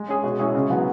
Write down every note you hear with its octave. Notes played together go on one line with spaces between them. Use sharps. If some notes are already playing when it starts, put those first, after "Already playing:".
Already playing: G#3
C#4 G#4
B2
G#3 C#4 E4 G#4
C#3
F#3 B3 F#4